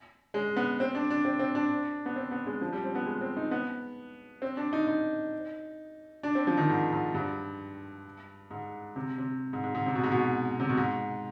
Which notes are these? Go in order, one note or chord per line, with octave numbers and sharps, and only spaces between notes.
G#3
B3
C4
D4
D4
C4
C4
D4
B3
C4
B3
G#3
F3
G3
C4
B3
G#3
C4
D#4
B3
C4
D4
D#4
D#4
D4
C4
F3
D#3
G#2
G#2
G2
G#2
C3
C3
G#2
G#2
G#2
C3
B2
G#2
B2
C3
B2
G#2